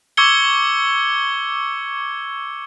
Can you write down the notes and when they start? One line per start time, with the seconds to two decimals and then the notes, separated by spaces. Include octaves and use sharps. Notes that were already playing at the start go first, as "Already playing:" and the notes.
0.17 C#6 D6 E6 G#6 C#7 G7